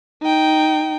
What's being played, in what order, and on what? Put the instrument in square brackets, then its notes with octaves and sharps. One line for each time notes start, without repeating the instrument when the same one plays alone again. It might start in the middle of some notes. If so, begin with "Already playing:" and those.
[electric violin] D#4 G5